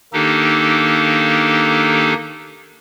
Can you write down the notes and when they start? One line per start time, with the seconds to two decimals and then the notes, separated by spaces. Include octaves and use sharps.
0.13 D#3 A#3 D4 D#4 G4 A4